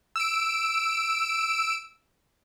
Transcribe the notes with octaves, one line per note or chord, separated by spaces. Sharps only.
E6 D7